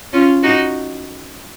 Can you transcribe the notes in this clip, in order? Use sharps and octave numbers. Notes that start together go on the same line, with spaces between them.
C#4 F4
D#4 F#4